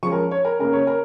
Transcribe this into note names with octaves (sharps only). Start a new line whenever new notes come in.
F3 G#3 C#4 C#6
A#4
C#5
A#4
C#3 A#3 C#4 A#4
C#5
A#4